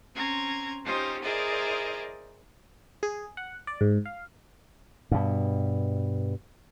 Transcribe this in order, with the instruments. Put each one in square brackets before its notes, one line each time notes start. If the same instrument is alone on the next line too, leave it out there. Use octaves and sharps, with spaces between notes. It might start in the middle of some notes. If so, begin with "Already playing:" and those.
[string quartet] C4 C#4 A#5 C6 G#6
C#4 D#4 F4 G4 C5
E4 G#4 A#4 C5 D5 D#5
[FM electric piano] G#4
F#5
D5
G#2
F5
[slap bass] G2 B2